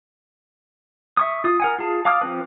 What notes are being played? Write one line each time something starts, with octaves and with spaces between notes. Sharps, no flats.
E5 C#6 D#6
F4 D#6
A#4 F#5 G#5
F4 G#4 A5
F5 A5 D6 D#6 F6
F3 C4 B4